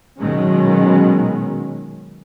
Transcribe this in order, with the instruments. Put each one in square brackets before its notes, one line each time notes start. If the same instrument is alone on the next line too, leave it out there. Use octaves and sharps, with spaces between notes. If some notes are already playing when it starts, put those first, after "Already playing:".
[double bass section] B2 D#3 F#3 G#3 C#4